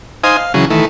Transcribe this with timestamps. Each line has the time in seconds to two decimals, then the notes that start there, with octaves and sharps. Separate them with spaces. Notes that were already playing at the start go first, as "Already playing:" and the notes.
0.24 D#4 C5 F5 G#5 D#6
0.37 F5
0.54 C#3 E3 F#3 G#4
0.70 D#3 E3 A3